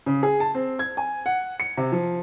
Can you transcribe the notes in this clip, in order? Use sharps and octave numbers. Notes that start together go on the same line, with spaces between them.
C#3
G#4
A5
C4
G#6
G#5
F#5
C#7
C3
F3